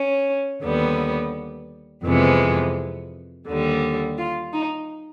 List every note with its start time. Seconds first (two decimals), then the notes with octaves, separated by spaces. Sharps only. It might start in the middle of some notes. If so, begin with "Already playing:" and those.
Already playing: C#4
0.62 D#2 D3 G3 B3
2.04 F2 C3 E3 G#3 B3
3.47 D#2 D3 G3
4.17 F4
4.53 D#4